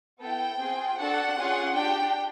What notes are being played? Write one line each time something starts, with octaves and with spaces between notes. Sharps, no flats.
B3 E4 A4 G5
C4 F4 G#4
D4 F#4 A4 F#5
C#4 F4 G#4
D4 G4 G5